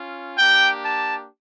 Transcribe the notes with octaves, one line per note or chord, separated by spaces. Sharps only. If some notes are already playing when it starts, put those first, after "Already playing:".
Already playing: C#4 F4
A#3 D4 G4 G5
A5